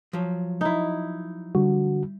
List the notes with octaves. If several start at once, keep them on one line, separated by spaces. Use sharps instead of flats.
F3 F#3
D#4 E4
D3 G3 F#4